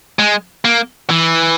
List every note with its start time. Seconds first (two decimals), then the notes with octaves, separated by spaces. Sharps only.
0.19 G#3
0.65 A#3
1.10 E3